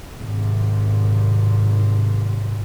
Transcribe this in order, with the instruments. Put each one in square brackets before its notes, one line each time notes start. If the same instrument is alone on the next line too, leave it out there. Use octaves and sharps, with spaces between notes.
[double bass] G#1 C3